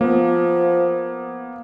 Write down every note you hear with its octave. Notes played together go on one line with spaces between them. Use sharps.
F3 A#3 B3